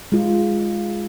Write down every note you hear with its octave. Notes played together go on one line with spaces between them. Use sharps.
G#3 F4